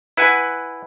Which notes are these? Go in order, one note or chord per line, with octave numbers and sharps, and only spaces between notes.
E4 B4 F#5 G#5